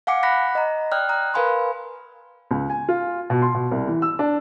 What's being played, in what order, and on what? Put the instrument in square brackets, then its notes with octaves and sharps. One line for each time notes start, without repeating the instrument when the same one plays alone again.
[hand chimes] F5 F#5 G#5 D6 C#7
F#5 B5 F#6 A#6 B6
D#5 A#5
D5 G5 D#6 F6 F#6
A#5 D#6 F#6
A#4 B4 F5 G#5 B5 C6
[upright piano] C#2
G#5
F4
B2
C6
B2
C2
E3
E6
D4